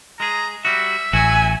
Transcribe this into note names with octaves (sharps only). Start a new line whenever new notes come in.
G#3 G#4 A#5
G3 F#4 E5
A1 F#3 F#4 G#5